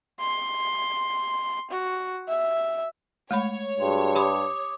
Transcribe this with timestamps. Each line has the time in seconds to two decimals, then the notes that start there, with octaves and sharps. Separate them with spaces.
0.20 C6
1.71 F#4
2.28 E5
3.31 G#3 A3 C#5 B5
3.80 G2 F#4 G#4 C6
4.15 G4 B5 C6 D6 D#6